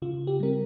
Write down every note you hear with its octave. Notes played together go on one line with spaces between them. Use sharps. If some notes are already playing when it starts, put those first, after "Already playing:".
C#3 F4
G4
G3 C4 A#4